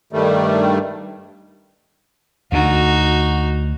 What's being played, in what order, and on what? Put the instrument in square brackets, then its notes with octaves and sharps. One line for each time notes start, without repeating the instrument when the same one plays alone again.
[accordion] G2 D#3 G3 A3
[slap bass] D2 D3 [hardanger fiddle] D#4 F#4